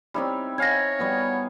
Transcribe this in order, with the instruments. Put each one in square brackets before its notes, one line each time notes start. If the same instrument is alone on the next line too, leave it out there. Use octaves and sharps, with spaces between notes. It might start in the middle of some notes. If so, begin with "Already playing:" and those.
[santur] G3 C#5 B5 [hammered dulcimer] C4 D#4 E4
[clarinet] C#5 [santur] D#5 F5 G#5 [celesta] G#6 A#6
[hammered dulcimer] G3 B3 F#4